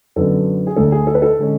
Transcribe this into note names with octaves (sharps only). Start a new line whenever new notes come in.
F#2 D3 F#3 B3 D4 A4
G#4
D2 D3 A3 D4 A4
G#4
A4
B4
A4
D3 G#3 C#4